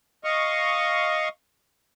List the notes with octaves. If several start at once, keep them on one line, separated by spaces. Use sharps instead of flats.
D#5 F5 C#6